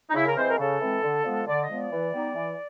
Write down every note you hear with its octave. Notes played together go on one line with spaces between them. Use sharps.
D#4
C#3 E4
A#4
E3 G#3 C4 C5
A#4
C#3 A4
E3 G#3 C4
D3
F3 G#3 B3
D3 D5
D#5
F3 G#3 B3 D5
E3
G3 B3 D#4
E3